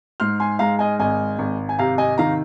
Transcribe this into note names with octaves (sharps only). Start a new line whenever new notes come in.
G#2 C6 F6
G#5 C6
G#3 F5 A#5
D#5 G#5
G#1 D#5 G#5
G#1
G#5
C3 F5 A#5
D#5 G#5
D#3 F5 A#5